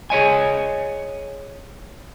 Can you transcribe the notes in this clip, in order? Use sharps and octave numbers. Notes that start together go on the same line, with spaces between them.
G#4 C#5 D#5 G#5